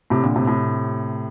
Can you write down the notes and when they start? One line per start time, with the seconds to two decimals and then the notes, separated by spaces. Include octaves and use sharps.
0.10 A2 C3
0.23 A#2 D3
0.36 A2 C3
0.47 A2 C3